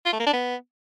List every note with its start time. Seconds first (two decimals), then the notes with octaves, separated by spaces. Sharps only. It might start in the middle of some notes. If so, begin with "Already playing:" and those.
0.06 F4
0.13 A3
0.19 A#3
0.26 D4
0.33 B3